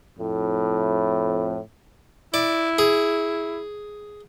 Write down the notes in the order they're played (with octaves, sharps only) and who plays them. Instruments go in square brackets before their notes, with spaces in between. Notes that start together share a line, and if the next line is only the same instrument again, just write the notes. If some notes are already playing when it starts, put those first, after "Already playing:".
[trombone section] F2 A2
[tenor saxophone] E4 [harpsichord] D5
[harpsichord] G#4